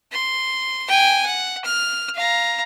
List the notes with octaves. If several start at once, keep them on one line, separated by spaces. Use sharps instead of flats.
C6
G5 G#5
F#5
F6
F5 A#5